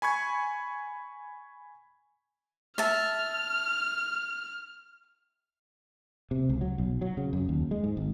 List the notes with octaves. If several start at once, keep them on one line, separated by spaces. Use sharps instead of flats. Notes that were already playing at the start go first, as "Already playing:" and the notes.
G#5 B5 C#6 G#6
E5 A5 F6
C3
C#2
F#3
B1
F#3
C#3
F#2
D#2
G#3
G#2
G#1